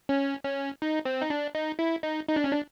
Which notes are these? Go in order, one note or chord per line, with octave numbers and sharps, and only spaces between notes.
C#4
C#4
D#4
C4
D#4
D4
D#4
E4
D#4
D#4
D4
C#4
D4